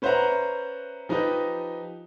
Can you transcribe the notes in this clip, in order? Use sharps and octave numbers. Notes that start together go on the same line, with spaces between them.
C#4 B4 C5 E5 F#5 A#5
F3 D#4 G4 B4 D#5